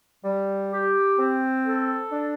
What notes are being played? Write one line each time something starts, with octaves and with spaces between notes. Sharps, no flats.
G3
G4
C4
A4
D4